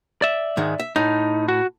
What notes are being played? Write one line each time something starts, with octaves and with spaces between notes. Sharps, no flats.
D5 E5
G#2 D#3 G#3
E5
A2 D#4
F#4